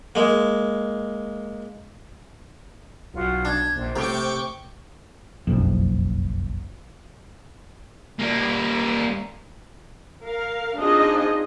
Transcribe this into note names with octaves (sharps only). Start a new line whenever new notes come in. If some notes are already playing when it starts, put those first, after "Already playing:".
G#3 A#3
B1 F4 F#4 F#5
D4 G#6
A#1 C5
A2 C3 G5 C#6 D6
F#1 B1 F2
G3 A#3
A#4 F5
C4 D4 D#4 F4 G#4 D#5